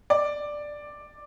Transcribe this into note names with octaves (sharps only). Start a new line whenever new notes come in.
D5